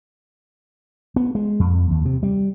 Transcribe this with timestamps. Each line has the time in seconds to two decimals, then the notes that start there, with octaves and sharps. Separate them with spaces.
1.16 B3
1.35 G#3
1.60 F2
1.91 D#2
2.05 C3
2.23 G3